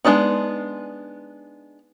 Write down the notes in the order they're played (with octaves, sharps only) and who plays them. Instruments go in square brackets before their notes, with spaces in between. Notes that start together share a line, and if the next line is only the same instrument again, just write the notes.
[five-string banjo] G#3 A#3 B3 D4 D#4